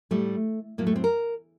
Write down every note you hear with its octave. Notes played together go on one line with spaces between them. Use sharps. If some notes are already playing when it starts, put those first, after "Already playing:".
A2 G3 A3
A2 F#3 A#3
A3
C4
A#4